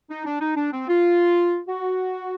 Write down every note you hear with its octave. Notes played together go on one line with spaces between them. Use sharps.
D#4
D4
D#4
D4
C4
F4
F#4